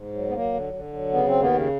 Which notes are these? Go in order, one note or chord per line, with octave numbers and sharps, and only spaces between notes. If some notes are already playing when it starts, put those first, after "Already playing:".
Already playing: G#2
F#3
B3
F#3 A#3
D3
D3
F#3
C#3 B3
C4
D#2
B3
C#3